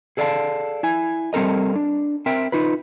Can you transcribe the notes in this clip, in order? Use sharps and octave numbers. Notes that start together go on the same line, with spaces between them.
G#4 A4 D5 D#5 F5 A5
E4 G#5
G3 C4 A4 A#4 D#5
D4
C4 A#4 E5 G5
D#4 F4 B4